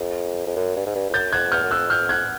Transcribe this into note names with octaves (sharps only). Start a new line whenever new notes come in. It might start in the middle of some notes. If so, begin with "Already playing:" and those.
Already playing: F2
F2
F#2
G2
G#2
G2
F2
F#2 G6 A6
F2 F#6 G#6
E2 F6 G6
F#2
F2 E6 F#6
F6 G6
F#6 G#6